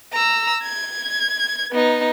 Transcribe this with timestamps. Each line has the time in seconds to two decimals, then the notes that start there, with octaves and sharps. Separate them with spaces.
0.13 A#5 E6
0.63 G#6
1.72 B3 D#4